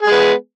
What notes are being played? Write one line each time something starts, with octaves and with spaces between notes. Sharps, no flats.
G#3 B3 G#4